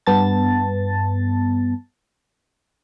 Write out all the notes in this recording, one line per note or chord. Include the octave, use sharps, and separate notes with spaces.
G2 B3 A5 A6